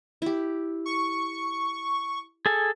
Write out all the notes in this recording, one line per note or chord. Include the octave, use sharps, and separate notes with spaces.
E4 G4
C#6
G#4 A4 G#5